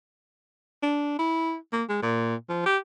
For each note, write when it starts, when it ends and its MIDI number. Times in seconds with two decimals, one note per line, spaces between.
0.83 1.14 62
1.19 1.56 64
1.73 1.84 58
1.89 2.02 56
2.02 2.35 46
2.50 2.63 53
2.66 2.78 67